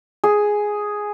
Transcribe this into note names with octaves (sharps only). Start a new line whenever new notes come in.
G#4